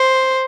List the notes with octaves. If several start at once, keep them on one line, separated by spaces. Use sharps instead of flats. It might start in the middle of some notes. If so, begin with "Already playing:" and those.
Already playing: C5